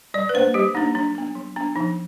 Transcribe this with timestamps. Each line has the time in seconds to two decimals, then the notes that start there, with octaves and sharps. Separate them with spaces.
0.14 G3 D5
0.29 B4
0.34 A#3 D4 C5
0.54 G3 G4
0.75 A#3 D4 D#4
0.95 F#3 D4
1.15 B3 D4
1.35 F#3
1.56 B3 D4
1.76 F3 D#4